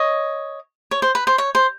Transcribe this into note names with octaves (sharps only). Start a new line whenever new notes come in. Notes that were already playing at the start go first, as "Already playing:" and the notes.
Already playing: C#5 D#5
C#5
C5
B4
C5
C#5
C5